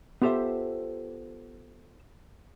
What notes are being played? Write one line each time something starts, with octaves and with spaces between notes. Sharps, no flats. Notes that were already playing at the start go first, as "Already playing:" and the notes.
B3 F4 G4 A4 C5 E5